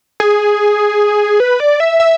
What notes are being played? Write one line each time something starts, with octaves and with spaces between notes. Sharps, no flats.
G#4
B4
D5
E5
E5